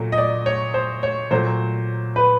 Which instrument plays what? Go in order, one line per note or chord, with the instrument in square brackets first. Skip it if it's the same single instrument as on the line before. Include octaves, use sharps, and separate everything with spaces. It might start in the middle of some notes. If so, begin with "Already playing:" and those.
Already playing: [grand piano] A#2 F#3 A3
D#5
D5
C#5
C5
C#5
A#2 F#3 A3 C5
B4